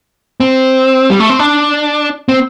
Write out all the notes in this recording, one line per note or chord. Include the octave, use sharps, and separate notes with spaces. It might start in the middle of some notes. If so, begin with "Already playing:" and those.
C4
G3
A3
C4
D4
C4